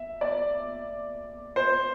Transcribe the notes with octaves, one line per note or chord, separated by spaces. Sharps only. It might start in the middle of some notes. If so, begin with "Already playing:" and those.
Already playing: E5
D5
C5